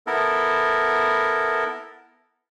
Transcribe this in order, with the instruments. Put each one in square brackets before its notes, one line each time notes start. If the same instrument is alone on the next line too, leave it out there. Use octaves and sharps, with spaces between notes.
[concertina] B3 E4 A4 A#4